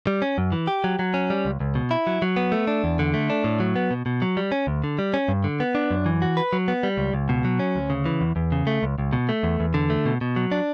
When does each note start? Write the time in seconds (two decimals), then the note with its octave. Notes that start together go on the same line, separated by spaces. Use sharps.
0.07 G3
0.22 C#4
0.38 F#2
0.52 E3
0.67 G4
0.84 F#3
0.99 F#3
1.14 C#4
1.30 G3
1.45 C#2
1.60 C#2
1.75 B2
1.91 E4
2.07 F#3
2.22 F#3
2.36 B3
2.52 A3
2.67 D4
2.84 E2
2.99 D3
3.14 A3
3.30 D4
3.44 A2
3.60 F#3
3.76 B3
3.91 B2
4.06 B2
4.22 F#3
4.37 G3
4.52 C#4
4.67 D2
4.84 D3
4.99 G3
5.14 C#4
5.28 G2
5.44 D3
5.60 B3
5.75 D4
5.91 F#2
6.06 E3
6.22 F#4
6.37 B4
6.53 F#3
6.68 B3
6.83 G3
6.98 C#2
7.14 C#2
7.29 B2
7.45 F#3
7.59 C#4
7.76 D2
7.90 C#3
8.06 E3
8.21 E2
8.36 E2
8.52 C#3
8.67 A3
8.83 C#2
8.98 C#2
9.13 B2
9.29 A3
9.43 E2
9.60 E2
9.74 D3
9.90 A3
10.06 B2
10.21 B2
10.36 F#3
10.52 D4